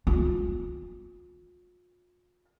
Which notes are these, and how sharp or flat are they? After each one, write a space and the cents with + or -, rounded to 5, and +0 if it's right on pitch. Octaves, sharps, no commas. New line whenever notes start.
F4 +40